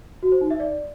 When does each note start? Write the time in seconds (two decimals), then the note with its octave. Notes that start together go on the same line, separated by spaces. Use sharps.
0.23 F#4
0.32 C5
0.41 D#4
0.50 E5
0.60 D5